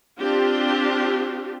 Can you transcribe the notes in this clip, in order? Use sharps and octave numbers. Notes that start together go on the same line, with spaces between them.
C4 D4 F4 G4